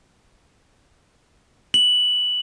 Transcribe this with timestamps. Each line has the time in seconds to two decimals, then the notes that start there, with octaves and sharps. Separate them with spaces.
1.74 F#7